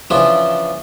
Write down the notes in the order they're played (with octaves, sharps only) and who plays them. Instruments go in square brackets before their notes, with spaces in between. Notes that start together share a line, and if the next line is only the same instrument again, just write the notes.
[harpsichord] C#3 E3 F3 D4 E4 F4